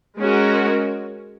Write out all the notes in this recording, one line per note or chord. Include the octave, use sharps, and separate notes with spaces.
G#3 C#4 F#4 A#4